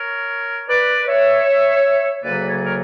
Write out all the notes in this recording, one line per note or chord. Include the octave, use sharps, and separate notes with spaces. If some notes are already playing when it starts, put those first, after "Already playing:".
Already playing: A#4 C#5
B4 D5
C#5 E5
D2 C#3 F#3 A#3 B4 D5
C#5
D5
A#4 C#5